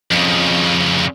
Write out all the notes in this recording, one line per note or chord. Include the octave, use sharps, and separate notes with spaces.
F2 C#3